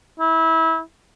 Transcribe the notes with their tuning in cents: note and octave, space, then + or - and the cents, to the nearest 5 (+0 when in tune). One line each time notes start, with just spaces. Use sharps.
E4 -25